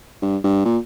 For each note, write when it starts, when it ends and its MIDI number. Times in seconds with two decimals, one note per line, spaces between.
0.22 0.37 43
0.44 0.61 43
0.65 0.78 46